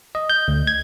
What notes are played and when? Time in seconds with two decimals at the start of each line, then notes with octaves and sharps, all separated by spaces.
0.15 D#5
0.30 G6
0.48 D2
0.67 G#6